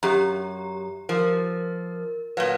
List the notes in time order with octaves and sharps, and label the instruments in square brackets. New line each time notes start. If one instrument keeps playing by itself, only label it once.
[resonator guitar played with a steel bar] F#2 [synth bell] G4 A#5
[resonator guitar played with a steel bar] F3 [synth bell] A#4
[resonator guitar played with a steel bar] A#2 F#3 [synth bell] B4 F5